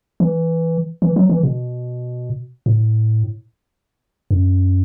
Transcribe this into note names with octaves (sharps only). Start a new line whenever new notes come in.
E3
E3
F#3
E3
B2
A2
F#2